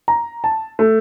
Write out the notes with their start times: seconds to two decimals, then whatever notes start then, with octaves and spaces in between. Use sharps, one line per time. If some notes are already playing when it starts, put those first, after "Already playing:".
0.08 A#5
0.44 A5
0.79 A3